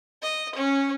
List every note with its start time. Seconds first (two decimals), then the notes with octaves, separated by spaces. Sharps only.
0.23 D#5
0.55 C#4